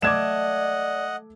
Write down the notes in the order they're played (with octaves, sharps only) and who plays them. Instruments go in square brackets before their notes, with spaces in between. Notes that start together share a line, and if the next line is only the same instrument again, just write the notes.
[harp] A3 [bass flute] D5 [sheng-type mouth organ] D#5 F#5 [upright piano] D6 G#6 E7